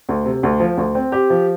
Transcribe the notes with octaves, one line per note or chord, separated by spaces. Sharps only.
D2
C3
D2
F3
D2
C4
G4
F3